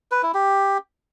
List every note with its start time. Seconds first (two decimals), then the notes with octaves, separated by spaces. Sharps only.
0.11 B4
0.23 E4
0.34 G4